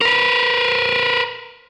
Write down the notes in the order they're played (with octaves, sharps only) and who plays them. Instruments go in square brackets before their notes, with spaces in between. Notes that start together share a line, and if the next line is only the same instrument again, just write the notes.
[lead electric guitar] A#4 B4